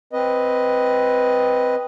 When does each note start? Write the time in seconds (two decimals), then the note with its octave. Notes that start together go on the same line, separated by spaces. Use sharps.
0.13 C4 B4 D#5